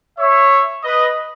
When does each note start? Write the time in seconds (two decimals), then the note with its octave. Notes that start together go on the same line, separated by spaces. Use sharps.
0.19 C#5 E5
0.83 B4 D#5